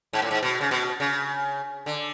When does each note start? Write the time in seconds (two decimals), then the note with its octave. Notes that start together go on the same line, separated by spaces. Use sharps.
0.13 G#2
0.22 A2
0.31 G#2
0.43 B2
0.61 C#3
0.71 B2
1.00 C#3
1.86 D3